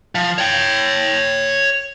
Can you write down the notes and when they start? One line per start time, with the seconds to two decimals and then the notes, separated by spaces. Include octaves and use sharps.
0.15 F3
0.38 C#5 G5